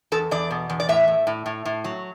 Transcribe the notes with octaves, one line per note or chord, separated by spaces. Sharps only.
E2 A4
E2 D5
B2
E2
D5
A2 E5
A2
A2
A2
A2
F#3